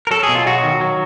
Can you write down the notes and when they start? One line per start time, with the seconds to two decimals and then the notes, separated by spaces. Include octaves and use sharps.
0.07 A#4
0.11 F#3 A4
0.23 G#4
0.29 B2
0.35 F4
0.46 F#3 F#4
0.63 D#3
0.81 F#3